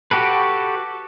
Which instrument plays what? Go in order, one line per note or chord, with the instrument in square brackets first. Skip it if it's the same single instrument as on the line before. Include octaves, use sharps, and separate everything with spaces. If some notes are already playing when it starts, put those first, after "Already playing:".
[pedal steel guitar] F#4 G4 A4 B4